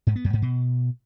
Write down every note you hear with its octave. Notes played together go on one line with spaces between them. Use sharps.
G#2
B3
F#2
G#2
B2